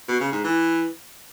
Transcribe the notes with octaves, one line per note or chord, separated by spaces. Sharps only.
B2
C#3
G#2
E3